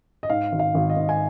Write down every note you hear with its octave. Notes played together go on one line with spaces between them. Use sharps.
D#5
G#2 F5
G#1
F5
G#1
D#5
G#2
G#5